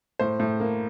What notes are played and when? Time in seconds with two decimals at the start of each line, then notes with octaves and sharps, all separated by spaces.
0.20 A2 C5
0.40 A2
0.60 A#3